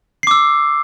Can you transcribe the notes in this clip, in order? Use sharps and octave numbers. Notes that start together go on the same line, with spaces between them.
D6 E6 C7